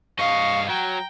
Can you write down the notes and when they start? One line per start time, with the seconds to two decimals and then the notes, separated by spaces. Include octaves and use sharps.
0.19 G2 D#5 F5 C#6
0.69 F#3 G5 A#5